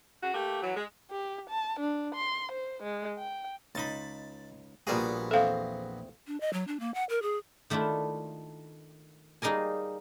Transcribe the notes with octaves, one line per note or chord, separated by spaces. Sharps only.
C#3 F#4
A3 A#3 G4
E3 F#3
G#3
G4
A5
D4
C6
C5
G#3
G5
C#2 D#4 A5 B5
A#1 A#2 G3 B3 F#4 G#4
E2 C4 A4 E5 F5
D4
D#5
F#3
D4
A#3
F#5
A#4
G#4
D#3 A3 D4 E4 F4
G3 A#3 D#4 G#4 A#4 G#5